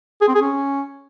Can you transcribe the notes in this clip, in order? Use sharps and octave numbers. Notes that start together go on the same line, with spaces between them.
G#4
C4
G#4
C#4